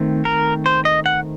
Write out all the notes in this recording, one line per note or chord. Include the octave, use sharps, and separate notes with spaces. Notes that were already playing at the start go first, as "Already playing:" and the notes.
Already playing: D#3 A3 C4
A#4
C5
D#5
F#5